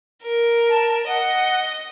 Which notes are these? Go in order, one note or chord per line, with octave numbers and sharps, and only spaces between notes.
A#4
A5
D#5 F#5